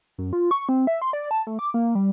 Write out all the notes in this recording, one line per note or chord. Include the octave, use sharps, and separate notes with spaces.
F#2
F4
C#6
C4
E5
C6
D5
A5
A3
D6
A#3
G3